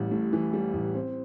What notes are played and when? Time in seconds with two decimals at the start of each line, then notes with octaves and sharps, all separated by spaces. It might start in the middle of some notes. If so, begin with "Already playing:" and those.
Already playing: A1 G3
0.11 A2
0.33 E3
0.53 G3
0.74 A1
0.94 C4